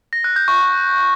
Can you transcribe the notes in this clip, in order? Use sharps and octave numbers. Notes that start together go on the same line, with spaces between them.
A#6
F#6
G6
C#6